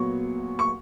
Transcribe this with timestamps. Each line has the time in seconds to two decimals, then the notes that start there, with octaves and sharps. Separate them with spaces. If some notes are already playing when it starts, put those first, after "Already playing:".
Already playing: A#2 F#3 B3 C#6
0.59 C#6